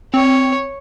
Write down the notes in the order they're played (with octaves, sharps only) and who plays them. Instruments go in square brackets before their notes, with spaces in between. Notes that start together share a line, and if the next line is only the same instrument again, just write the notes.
[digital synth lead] C4 [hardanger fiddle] C#5